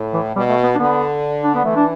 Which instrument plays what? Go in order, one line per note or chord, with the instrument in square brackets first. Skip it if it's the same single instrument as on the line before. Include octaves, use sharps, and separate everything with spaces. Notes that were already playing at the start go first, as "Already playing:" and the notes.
Already playing: [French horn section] A2
[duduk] E3
[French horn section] B2 [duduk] G3
[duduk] A3
B3
D4
[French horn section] D3 [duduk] B3
[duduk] D4
B3
[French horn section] E3 [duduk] A3
[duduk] D4